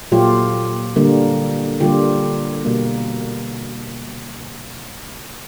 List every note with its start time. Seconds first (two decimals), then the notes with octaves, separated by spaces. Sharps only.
0.12 A#2 F#3 A3 F4 G4
0.96 D3 G3 A#3
1.80 D3 G3 A#3 F4 G4
2.65 B2 G3 A#3